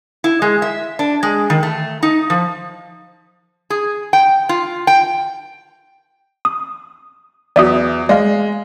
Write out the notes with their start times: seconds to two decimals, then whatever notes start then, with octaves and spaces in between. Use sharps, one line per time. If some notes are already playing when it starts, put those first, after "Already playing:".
0.24 E4
0.42 G#3
0.62 E5
0.99 D4
1.23 G#3
1.50 D#3
1.63 A3
2.03 D#4
2.30 F3
3.70 G#4
4.13 G5
4.49 F4
4.87 G5
6.45 D#6
7.56 E2 F#3 D5 E5 D#6
8.09 G#3 D5 F5